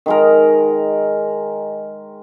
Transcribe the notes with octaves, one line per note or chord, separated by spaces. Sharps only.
D#3 G#3 A#4